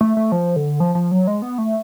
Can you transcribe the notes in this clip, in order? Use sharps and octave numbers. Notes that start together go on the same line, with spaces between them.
A3
A3
F3
D3
F3
F3
F#3
G#3
B3
A3